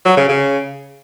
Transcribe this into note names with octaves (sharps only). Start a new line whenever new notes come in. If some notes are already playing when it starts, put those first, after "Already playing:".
F#3
C#3
C#3